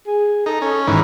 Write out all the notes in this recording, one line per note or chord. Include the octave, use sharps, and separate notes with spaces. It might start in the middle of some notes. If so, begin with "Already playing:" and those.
G#4
D#4 A4
C#4 A4
G#2 D#3 E3 C#4